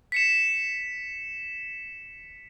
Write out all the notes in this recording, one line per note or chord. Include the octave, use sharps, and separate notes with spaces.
B6 C#7 E7